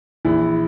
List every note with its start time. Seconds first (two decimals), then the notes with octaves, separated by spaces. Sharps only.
0.25 A#1 E3 E4